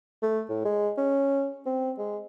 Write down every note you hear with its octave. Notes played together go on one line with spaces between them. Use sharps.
A3
A2
G#3
C#4
C4
G#3